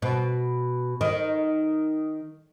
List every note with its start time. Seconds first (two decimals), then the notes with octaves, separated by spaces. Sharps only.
0.02 B2
1.01 D#3